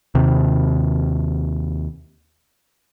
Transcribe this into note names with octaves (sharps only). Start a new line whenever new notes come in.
D#2 C3